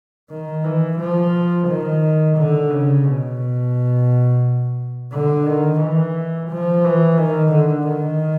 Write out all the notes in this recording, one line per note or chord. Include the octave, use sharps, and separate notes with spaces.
D#3
E3
F3
D#3
D3
C#3
B2
D3
D#3
E3
F3
E3
D#3
D3
D#3